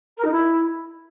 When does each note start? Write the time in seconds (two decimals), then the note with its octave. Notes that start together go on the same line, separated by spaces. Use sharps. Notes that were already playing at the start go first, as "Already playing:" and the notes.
0.17 A#4
0.24 D#4
0.32 E4